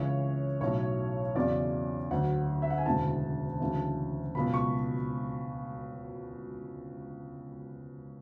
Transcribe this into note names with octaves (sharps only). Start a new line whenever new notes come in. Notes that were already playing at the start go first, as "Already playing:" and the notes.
Already playing: C#2 C#3 E3 C#5
B1 A2 F#3 C#5
E2 C#3 F#3 D5
D2 D3 F#3 F#5
E5
F#5
G#5
E1 D2 C#3 E3 A5
D2 C#3 E3
C#2 B2 F#3 B5
C#6